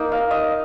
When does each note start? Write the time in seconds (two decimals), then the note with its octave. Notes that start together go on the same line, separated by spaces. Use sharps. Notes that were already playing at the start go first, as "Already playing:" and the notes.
Already playing: A#3 D#4
0.12 F5
0.31 D#5